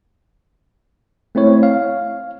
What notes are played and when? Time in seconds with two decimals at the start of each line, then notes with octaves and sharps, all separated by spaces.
1.35 A3 C4 E4 C#5
1.63 F5